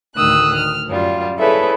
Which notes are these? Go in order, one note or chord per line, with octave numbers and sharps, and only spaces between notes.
D2 A2 D#3 D#6 E6 F#6
F6
F#2 G3 F4
E4 G#4 A4 B4 C#5 E5